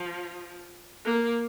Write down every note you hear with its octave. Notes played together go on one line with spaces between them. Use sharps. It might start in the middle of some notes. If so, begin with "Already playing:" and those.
Already playing: F3
A#3